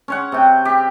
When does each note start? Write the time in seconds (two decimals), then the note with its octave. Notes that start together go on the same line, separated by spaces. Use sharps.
0.08 C#4 C#5 F#5
0.32 C3 G5
0.65 G4